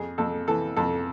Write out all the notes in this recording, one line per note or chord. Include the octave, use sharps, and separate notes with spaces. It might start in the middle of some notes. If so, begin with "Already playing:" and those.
Already playing: F2 G#4
F2 A4
E3 A4
F2 A4